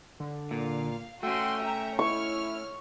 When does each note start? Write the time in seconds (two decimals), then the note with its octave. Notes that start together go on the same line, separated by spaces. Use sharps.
0.20 D3
0.51 A#2 F5
1.23 A3 C#4 F#4 G5 C6
1.63 E5 A#5
1.99 E4 C#5 C#6 F6